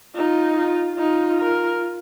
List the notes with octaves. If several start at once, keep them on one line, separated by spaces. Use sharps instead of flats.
D#4 F4
F4
D#4 F4
A#4